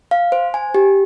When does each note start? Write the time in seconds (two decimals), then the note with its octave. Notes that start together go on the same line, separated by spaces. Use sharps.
0.11 F5
0.32 C5
0.54 G#5
0.74 G4